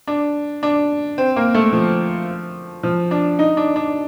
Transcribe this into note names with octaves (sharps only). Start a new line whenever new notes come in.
D4
D4
C4
A#3
A3
F3
F3
D4
D#4
D4
D4